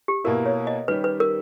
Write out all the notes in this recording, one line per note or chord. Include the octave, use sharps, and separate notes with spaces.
G4
B2 A#3 E4 A#4
C#5
D#5
D#3 G3 C#4 G4 B4
B4
A#4